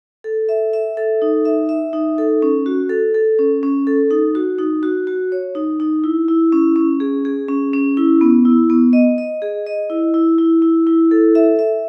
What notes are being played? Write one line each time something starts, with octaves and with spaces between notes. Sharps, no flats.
A4
E5
E5
A4
D#4
E5
E5
D#4
A4
C#4
F#4
A4
A4
C#4
C#4
A4
D#4
F#4
D#4
F#4
F#4
C#5
D#4
D#4
E4
E4
C#4
C#4
G#4
G#4
C#4
C#4
E4
B3
E4
B3
D#5
D#5
G#4
D#5
E4
E4
E4
E4
E4
A4
E5
E5